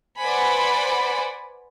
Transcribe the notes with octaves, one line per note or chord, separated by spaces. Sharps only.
B4 C5 D5 F#5 G#5 B5